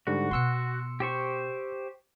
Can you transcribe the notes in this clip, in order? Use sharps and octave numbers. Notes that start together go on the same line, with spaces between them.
G#2 D3 G3 F#4
B2 B3 C6 E6 C#7
G4 C5 C#6